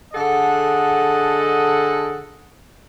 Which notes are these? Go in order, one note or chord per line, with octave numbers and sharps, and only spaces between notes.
D3 G#4 A4 D#5 F#5